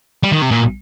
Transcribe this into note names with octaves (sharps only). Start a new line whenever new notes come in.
G3
D#3
C3
A#2